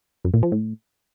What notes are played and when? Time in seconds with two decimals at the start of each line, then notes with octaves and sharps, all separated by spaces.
0.24 F#2
0.34 A#2
0.43 F3
0.52 A2